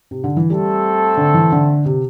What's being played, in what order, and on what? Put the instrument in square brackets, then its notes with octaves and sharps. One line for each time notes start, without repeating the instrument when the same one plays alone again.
[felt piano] C3
D3
E3
[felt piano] G3 [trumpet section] A3 C4 A4
[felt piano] D3
E3
D3
C3